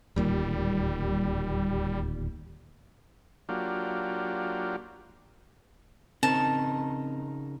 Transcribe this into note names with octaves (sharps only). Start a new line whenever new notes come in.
D1 D#2 A#2 G3
F#3 A#3 D4 F4 G4
C#3 C4 D#4 A#4 A5